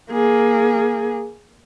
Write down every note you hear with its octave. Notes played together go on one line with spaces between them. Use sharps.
A#3 G#4